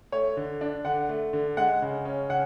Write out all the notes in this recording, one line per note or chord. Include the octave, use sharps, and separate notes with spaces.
A3 C#5
D3
D4
D3 F#5
A3
D3
G#3 F#5
C#3
C#4
C#3 F#5